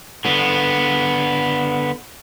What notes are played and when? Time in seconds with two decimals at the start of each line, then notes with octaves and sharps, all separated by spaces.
0.25 D3 B3